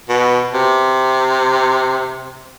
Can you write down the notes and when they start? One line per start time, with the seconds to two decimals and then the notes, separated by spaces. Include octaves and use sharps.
0.09 B2
0.54 C3